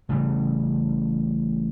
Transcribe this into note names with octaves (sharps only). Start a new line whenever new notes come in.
A1 C#3 E3 G3